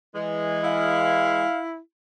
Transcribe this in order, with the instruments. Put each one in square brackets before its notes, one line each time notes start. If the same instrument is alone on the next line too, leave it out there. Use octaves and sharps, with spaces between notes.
[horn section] E3 G#3
[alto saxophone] E4 [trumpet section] F5